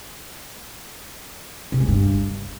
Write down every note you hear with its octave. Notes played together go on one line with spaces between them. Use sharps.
C3
G3
G2